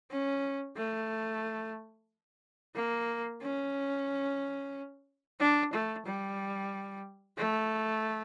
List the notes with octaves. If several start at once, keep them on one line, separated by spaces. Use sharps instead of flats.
C#4
A3
A#3
C#4
D4
A3
G3
A3